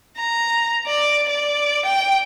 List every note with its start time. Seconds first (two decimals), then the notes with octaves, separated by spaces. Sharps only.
0.17 A#5
0.87 D5
1.29 D5
1.85 G5